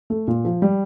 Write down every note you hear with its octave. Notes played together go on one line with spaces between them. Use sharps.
A3
A#2
F3
G3